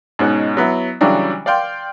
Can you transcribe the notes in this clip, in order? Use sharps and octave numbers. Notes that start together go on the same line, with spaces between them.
G#2 B2 C#4 D#4 F#6
F#3 B3 E4
C#3 E3 F#3 G3 D4
D5 F5 G5 C6